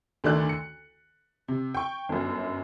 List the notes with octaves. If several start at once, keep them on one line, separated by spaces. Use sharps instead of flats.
D2 D3 D#3 A3 D5 F#6
C#7
C3
G5 C#6
G1 F#2